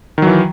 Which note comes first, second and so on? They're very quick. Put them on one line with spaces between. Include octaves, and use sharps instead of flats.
D#3 F#3 E3